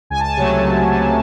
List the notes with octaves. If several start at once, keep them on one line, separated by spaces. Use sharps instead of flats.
C#2 G#5
A5
G#5
C3 F#3 A3
C#2
C3 F#3 A3